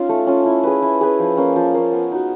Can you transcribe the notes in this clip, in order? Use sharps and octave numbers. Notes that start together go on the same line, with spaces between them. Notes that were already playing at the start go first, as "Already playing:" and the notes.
Already playing: C#4 D#4 F4
A3
C#4 F4
E4
G#4 B4
E4
G#4 B4
F3
A#3 C#4
F3
A#3 C#4
B3
D#4 F#4